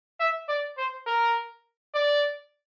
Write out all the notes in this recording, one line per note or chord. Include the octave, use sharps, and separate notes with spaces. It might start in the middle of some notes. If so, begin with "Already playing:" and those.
E5
D5
C5
A#4
D5